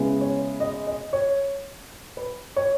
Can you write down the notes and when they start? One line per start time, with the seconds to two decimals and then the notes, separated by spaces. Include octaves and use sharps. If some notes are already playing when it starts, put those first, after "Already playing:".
Already playing: C#3 G#3 B3 E4
0.21 C#5
0.60 D#5
0.87 D#5
1.13 C#5
2.17 B4
2.56 C#5